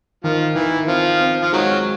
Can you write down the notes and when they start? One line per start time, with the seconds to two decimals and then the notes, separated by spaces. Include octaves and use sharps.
0.24 D#3 F3
0.55 D#3 E3
0.88 F3 C4
1.20 C4
1.42 F3
1.53 D#3 F#3 G#3